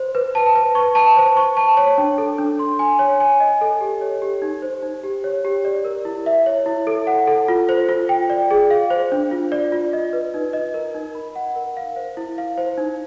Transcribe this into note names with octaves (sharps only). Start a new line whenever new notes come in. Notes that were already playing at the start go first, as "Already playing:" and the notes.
Already playing: C5
B4
A5
B4
C#6
A5
C5
C#6
A5
C#5
D4
A4
D4
C6
G#5
C#5
G#5
D#5
A4
G4
C#5
G4
D#4
C5
D#4
G4
C#5
G4
D5
A#4
E4
E5
C#5
E4
A4
F#5
A4
F4
C5
F4
G5
D5
G#4
F5
C5
D4
F4
D5
F4
D#5
B4
D#4
D#5
A#4
D#4
B5
F#5
A#4
F5
C5
E4
F5
C5
D#4